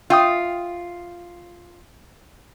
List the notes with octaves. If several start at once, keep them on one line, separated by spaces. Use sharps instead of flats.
F4 E5 G5 D#6